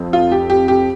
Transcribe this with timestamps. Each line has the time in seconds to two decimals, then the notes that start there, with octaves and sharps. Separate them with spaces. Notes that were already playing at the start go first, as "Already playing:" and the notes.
Already playing: F2 F3 C4
0.13 F4
0.32 G4
0.50 G4
0.68 G4